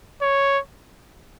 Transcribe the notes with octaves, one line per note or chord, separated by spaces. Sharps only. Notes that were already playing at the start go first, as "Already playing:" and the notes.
C#5